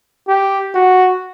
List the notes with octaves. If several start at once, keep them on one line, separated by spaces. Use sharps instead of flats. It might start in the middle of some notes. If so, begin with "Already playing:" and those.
G4
F#4